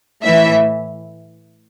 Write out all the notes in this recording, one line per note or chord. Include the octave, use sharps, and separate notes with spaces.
A2 E3 E5